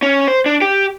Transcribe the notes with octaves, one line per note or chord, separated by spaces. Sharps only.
C#4
C5
D4
G4